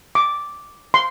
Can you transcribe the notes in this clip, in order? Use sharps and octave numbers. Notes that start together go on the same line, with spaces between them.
D6
C6